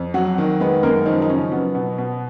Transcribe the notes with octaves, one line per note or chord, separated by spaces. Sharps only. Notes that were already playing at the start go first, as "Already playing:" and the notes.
Already playing: F2
F#3 F#4
D#3
G#3 B3 B4
F#2 A#3 A#4
D#3 F3 D#4
D#4
C#3 C#4
F#3 B3
B2
B2